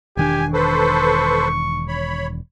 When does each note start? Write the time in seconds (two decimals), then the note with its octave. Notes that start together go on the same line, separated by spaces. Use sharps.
0.17 E1 D#3 D4 G4 G#5
0.54 A4 B4 C5 C#6
1.88 C#5 B5